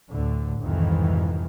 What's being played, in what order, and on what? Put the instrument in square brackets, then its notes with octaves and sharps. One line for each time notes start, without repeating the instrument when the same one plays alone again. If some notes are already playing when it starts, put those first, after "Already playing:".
[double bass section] D2 A2 D3
C2 F2 G#2 D#3 E3